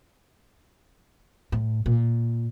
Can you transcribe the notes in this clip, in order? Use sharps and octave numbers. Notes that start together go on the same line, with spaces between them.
A2
A#2